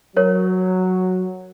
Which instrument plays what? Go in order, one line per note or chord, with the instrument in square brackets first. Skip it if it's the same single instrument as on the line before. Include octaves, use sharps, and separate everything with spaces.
[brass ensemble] F#3 [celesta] A#4 C#5